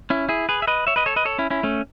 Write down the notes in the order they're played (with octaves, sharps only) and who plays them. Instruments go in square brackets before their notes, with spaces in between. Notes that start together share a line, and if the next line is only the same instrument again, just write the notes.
[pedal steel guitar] C#4 E4
E4 G#4
G#4 B4
E5
B4 D#5
C#5 E5
B4 D#5
A4 C#5
B4 D#5
A4 C#5
C#4 E4
C#4 E4
A3 C#4